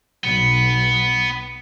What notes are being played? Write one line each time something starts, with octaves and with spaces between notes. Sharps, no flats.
B1 B3